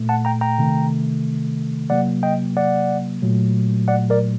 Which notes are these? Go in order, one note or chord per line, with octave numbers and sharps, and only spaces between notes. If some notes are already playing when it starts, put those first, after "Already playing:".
Already playing: A#2 A3
F#5 A5
G5 A#5
G5 A#5
C3 D#3 A3
C3 F#3 A#3 D5 F#5
D#5 G5
D5 F#5
A#2 F#3 A3
D5 F#5
A#4 D5